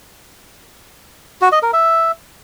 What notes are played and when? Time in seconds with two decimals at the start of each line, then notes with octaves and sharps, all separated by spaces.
1.41 F#4
1.52 D#5
1.63 A#4
1.73 E5